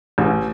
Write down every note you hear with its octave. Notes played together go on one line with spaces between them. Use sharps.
A1